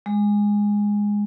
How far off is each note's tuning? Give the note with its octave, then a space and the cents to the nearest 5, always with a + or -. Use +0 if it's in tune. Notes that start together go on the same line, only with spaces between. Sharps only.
G#3 -10